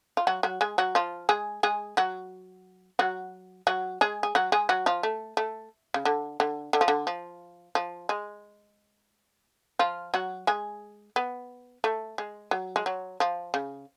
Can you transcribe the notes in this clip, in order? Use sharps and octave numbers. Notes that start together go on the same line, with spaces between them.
F4
F#3 F#4
F#3 F#4
G#3 G#4
F#3 F#4
F3 F4
G#3 G#4
G#3 G#4
F#3 F#4
F#3 F#4
F#3 F#4
G#3 G#4
G#4
F#3 F#4
G#3 G#4
F#3 F#4
F3 F4
A3
A3
C#3
D3
D3
D3
F3
D3
F3
F3
G#3
F3 F4
F#3 F#4
G#3 G#4
B3
A3
G#3
F#3
G#3
F#3
F3
C#3